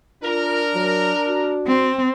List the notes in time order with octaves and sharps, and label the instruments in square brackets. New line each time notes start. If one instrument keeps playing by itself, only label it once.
[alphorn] D4 [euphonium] F4 [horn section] A#4
[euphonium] F#3
F#4
[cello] C4